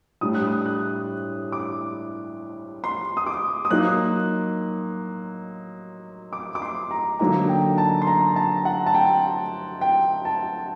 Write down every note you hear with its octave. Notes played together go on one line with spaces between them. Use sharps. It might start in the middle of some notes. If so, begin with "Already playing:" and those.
A2 G3 D4 D#6
F#6
D#6
F#6
D6
C6
D#6
D6
D#6
F#3 A#3 D#4 F#6
D6
D6
C6
A#5
D3 F#3 A#3 D#4 A#5
G5
A5
C6
A#5
A5
F#5
A5
G5
G5
A5